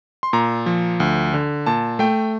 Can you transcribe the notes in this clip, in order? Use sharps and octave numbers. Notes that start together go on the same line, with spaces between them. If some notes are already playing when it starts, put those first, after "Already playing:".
C6
A#2 A#5
F3
D2
D3
A#2 A5
A3 G5